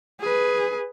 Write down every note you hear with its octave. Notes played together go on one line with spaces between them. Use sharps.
G#4 B4